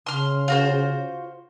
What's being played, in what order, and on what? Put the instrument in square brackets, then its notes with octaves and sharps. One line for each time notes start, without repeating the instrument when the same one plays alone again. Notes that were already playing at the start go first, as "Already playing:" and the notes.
[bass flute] C#3 [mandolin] C6 F6
[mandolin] F4 F#4 C5